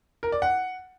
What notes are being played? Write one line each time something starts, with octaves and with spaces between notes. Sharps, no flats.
A#4
D5
F#5